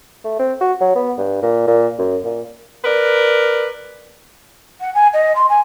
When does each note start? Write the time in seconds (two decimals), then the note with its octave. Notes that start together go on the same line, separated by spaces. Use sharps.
0.24 A3
0.39 C4
0.61 F#4
0.81 F#3
0.95 B3
1.18 G2
1.42 A#2
1.67 A#2
1.98 F#2
2.25 A#2
2.84 A#4 B4 D5
4.80 F#5
4.94 G#5
5.13 D#5
5.35 C6
5.49 G#5